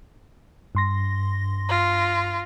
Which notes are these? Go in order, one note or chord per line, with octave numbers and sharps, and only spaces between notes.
G2 C6 A#6
F4